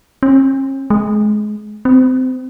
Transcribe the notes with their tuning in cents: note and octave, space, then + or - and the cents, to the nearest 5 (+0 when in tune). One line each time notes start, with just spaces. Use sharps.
C#4 -45
G#3 +25
C4 -25